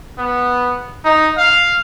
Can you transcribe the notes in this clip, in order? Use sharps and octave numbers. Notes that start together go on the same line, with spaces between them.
B3
D#4
F5